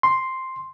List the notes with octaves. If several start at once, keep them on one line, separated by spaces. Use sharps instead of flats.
C6